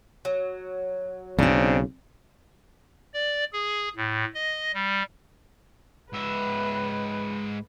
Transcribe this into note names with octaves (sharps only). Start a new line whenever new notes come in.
F#3
B1 C#3 C4 D4
D5
G#4
A2
D#5
G3
G#2 B4 E5